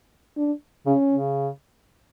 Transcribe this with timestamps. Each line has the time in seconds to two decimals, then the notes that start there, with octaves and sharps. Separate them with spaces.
0.37 D4
0.86 C#3 C#4
1.11 C#3